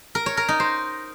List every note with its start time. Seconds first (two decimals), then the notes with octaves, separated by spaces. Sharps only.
0.15 A#4
0.26 C#5
0.37 A#4
0.49 D#4
0.60 C5